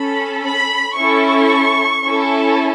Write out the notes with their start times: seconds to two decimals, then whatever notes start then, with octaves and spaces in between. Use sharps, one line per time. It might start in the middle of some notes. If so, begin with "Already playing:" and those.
Already playing: C#4 A4 B5
0.43 B5
0.96 C#4 E4 A4 C#6
2.04 C#4 E4 A4